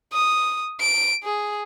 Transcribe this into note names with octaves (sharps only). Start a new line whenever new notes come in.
D#6
D7
G#4